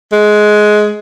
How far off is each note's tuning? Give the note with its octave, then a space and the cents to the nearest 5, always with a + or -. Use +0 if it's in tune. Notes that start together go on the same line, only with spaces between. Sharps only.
G#3 +15